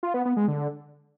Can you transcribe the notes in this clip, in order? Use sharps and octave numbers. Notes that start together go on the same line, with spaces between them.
F4
B3
B3
G#3
D3